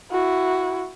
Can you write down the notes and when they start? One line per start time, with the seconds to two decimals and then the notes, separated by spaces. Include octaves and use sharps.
0.12 E4 F#4